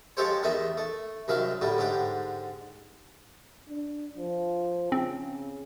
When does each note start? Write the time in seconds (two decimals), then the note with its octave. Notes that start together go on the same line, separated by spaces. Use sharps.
0.17 F3 G#3 G4 A4 C5 C#5
0.43 E2 D#3 A3 D#5 E5
0.77 A3
1.28 C2 F#2 D#3 E5 F5
1.61 A2 D3 G3
1.78 G#2 D3 G4
3.69 D4
4.17 F3
4.92 C#3 C4